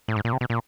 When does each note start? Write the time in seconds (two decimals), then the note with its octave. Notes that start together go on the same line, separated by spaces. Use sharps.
0.08 A2
0.16 G#2
0.25 A#2
0.33 C3
0.41 B2
0.50 A#2